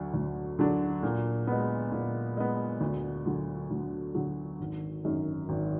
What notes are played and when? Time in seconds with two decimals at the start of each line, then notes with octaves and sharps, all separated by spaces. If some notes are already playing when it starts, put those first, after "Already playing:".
Already playing: D2 D3 F#3 D4
0.14 D2
0.59 D3 F#3 D4
1.03 A#2
1.47 G#3 B3
1.92 A#2
2.37 G#3 B3
2.81 D2
3.26 D3 F#3
3.71 D2
4.15 D3 F#3
4.60 G#1
5.05 F#2 D#3
5.49 G#1